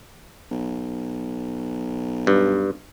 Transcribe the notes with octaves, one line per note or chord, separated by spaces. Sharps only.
B1
G2